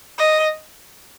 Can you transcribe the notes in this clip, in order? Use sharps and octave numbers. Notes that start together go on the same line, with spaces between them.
D#5